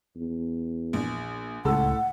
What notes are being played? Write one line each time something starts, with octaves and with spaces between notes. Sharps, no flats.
E2
A#1
C#2 A2 A4 F#5 E6